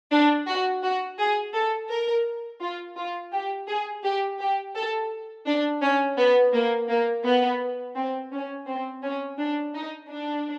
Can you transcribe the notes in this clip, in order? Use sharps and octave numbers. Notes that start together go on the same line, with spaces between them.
D4
F#4
F#4
G#4
A4
A#4
F4
F4
G4
G#4
G4
G4
A4
D4
C#4
B3
A#3
A#3
B3
C4
C#4
C4
C#4
D4
D#4
D4